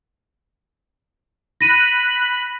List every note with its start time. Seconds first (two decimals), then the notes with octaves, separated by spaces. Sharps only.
1.61 B5 F#6 A#6 D#7